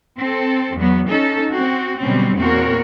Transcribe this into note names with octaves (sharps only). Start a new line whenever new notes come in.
C4 A4
E2 F#3 B3
C#4 D#4 A4
C4 F#4
B2 D3 F#3 G3 C4 C#4
E2 A#2 C4 F#4 A#4 C#5